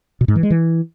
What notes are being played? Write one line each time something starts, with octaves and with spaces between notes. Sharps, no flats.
B2
G#2
E3
G#3
E3